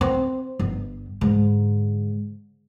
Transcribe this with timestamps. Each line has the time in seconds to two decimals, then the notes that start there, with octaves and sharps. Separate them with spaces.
0.01 C4
0.59 G1
1.21 G#2 D3